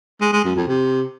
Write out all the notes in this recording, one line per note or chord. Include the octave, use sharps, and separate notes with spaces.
G#3
G#3
F#2
F2
C3